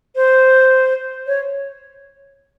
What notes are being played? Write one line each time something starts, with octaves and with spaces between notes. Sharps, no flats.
C5
C#5